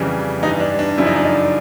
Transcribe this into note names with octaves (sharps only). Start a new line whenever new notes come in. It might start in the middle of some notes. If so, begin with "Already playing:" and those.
Already playing: F2 C#3 E3 G3
G2 E3 G3 D#4
D4
D4
F#2 C#3 F3 E4
D#4
D4
D#4